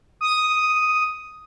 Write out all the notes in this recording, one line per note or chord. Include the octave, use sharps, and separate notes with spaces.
D#6